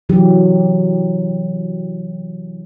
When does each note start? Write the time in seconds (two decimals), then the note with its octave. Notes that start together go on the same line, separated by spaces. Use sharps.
0.09 C3 E3 F#3 G4